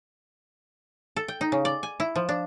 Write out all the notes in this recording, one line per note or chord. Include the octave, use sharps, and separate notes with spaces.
A4
G5
D#4
C#3
D5
G#5
E4
F3
D4